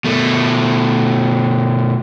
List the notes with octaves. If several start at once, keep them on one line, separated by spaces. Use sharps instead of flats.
B2 A3